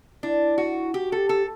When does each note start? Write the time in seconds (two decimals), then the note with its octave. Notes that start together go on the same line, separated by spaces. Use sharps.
0.23 D4 E4
0.58 F#4
0.94 F#4 G4
1.12 A4
1.18 G4
1.29 A4